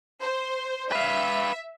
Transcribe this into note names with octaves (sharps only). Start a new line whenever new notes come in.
C5
B4 E5 F5